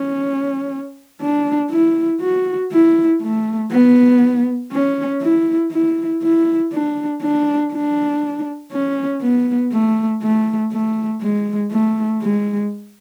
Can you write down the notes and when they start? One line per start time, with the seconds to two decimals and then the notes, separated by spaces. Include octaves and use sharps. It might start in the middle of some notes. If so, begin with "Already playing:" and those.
Already playing: C#4
1.21 D4
1.71 E4
2.21 F#4
2.72 E4
3.22 A3
3.71 B3
4.72 C#4
5.21 E4
5.72 E4
6.22 E4
6.72 D4
7.22 D4
7.72 D4
8.72 C#4
9.21 B3
9.72 A3
10.22 A3
10.72 A3
11.22 G#3
11.71 A3
12.22 G#3